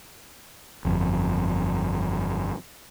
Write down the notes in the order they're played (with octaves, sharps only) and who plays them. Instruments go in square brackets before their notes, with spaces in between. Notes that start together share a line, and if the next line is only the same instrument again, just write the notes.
[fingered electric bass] G1 F2